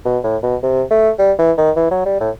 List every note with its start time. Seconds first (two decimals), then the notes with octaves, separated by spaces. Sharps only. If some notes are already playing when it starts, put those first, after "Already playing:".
0.05 B2
0.24 A2
0.43 B2
0.63 C3
0.91 A3
1.19 G3
1.39 E3
1.58 D#3
1.76 E3
1.91 F#3
2.06 G3
2.20 A2